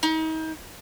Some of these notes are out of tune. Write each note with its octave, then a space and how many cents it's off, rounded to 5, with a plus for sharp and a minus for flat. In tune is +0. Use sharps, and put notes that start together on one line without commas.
D#4 +35